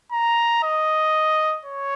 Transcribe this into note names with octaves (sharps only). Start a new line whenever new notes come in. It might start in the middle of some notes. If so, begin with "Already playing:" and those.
A#5
D#5
C#5